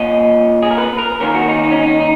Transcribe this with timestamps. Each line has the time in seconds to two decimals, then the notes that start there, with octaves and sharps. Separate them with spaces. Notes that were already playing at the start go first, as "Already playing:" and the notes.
Already playing: A#2 A#3 C#4 D#5
0.62 G#4
0.71 A#4
0.78 B4
0.98 A#4
1.20 D#3 A#3 C#4 A#4
1.35 F#4
1.49 D#4
1.64 D#4
1.71 C#4
1.81 D#4
2.00 D#4